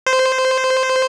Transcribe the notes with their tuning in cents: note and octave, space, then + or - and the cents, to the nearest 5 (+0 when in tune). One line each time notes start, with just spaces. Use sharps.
C5 -10